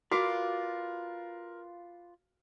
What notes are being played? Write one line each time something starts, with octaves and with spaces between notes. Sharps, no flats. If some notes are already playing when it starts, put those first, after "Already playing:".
F4 F#4 A#4 B4 D5 F5 D6